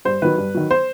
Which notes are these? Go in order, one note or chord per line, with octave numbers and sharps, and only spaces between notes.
G2 C5
D#3 F#3 B4
G2
D#3 F#3
C5